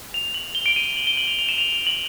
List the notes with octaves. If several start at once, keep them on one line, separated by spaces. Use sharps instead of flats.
F7
F#7
G7
D7
D#7
F7
F#7
G7
F#7
F7
F7
E7
F7
F7
F#7